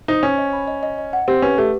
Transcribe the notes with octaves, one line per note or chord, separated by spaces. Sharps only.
D#4 C5
C#4 C5
D#5
B5
D#5
D#5
D#5
F#5
C4 G4
C#4 B4
A3 G4